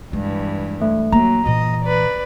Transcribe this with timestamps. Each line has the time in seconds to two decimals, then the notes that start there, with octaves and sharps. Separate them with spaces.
0.13 G2 E3 G#3
0.82 A3
1.12 F#3 A#3 A#5
1.46 A#2 E3 D#5
1.84 B4 D5